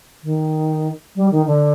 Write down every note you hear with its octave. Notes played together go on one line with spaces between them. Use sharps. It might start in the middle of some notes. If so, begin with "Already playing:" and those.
D#3
G3
D#3
D3